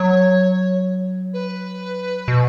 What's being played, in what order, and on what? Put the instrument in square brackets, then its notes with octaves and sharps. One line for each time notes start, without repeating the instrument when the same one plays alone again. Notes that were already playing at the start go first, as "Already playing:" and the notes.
Already playing: [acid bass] F#3 [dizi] C#5
[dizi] B4
[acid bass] B2